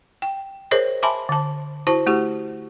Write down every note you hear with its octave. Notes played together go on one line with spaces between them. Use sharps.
G5
G#4 A#4 C5 C#5 D#5
E5 G#5 A5 B5 C6 D6
D3 A5
E4 F#4 C5 A5
A3 E4 F#4 G4